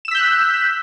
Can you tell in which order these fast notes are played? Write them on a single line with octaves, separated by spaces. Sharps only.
E7 E6 B6 G6 F#6